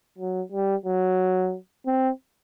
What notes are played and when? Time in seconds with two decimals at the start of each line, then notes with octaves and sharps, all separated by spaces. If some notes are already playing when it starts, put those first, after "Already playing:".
0.18 F#3
0.52 G3
0.85 F#3
1.86 C4